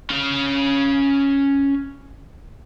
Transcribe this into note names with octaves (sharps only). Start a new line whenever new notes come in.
C#4 F5